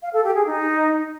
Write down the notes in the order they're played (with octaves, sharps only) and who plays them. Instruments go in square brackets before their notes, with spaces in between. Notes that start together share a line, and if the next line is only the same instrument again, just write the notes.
[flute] F5
A4
G4
G#4
D#4